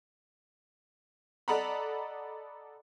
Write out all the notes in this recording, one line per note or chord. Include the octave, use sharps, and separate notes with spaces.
A4 D5 D#5 F#5 A#5 B5